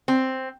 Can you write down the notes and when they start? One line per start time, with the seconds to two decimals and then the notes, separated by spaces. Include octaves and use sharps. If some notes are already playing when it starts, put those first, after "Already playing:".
0.08 C4